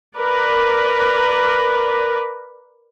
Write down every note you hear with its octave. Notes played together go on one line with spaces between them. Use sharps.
A#4 B4 D5